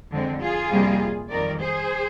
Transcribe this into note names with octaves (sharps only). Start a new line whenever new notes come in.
F2 D3 G#3 C4
F4 G#4
F2 C3 G3 A#3
F2 D#3 G3 A#4 D5
G#4 C5